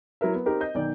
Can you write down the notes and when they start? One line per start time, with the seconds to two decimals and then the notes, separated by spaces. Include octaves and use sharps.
0.21 F#3 E4 A#4 E5
0.34 B3
0.46 C4 D#4 G4 A#4 C5
0.61 D#5 G6
0.74 B1 D#3 D5